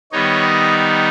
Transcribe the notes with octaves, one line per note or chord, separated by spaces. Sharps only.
D#3 G3 B3 D#4 C#5
D#5